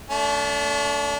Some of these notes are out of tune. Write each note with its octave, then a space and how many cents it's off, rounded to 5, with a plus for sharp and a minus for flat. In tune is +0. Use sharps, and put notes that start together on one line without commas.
A3 +10 D4 -35